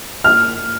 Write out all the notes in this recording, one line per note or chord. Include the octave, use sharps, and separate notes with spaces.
F6